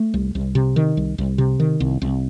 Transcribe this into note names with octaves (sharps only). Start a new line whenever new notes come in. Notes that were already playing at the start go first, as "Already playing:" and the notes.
Already playing: A3
C2
C2
C3
D#3
C2
C2
C3
D#3
C2
C2